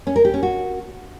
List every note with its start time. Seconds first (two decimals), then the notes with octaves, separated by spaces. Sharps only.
0.07 C#4
0.16 A#4
0.25 G4
0.34 C#4
0.43 F#4